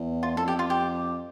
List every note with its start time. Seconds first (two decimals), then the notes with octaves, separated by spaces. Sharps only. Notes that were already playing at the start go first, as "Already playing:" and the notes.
Already playing: E2
0.23 F4
0.37 F2 A4
0.48 G4
0.59 F4
0.70 G4